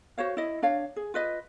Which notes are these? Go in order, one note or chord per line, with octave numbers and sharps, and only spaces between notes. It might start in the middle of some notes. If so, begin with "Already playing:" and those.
F#4 C5 C#5 F5
E4 D#5
D4 C#5 F5
G#4
F4 B4 D#5